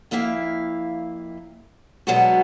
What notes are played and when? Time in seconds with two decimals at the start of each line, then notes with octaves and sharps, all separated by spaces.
0.11 F2 A#3 E4 E5 F5
2.07 B2 F#3 G#3 B3 D4 F#4